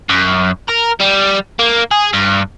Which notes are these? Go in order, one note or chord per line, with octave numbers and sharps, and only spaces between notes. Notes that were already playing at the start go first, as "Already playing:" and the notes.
F#2
A#4
G3
A#3
G#4
G2